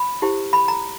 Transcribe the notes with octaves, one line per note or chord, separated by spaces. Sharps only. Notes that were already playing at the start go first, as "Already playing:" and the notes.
Already playing: B5
E4 G4 C5
B5
A#5